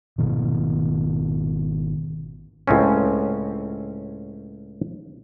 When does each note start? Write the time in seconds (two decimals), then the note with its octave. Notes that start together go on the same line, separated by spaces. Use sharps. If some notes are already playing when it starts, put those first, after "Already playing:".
0.18 G#1 B2 D#3
2.67 C#2 A2 C4 C#4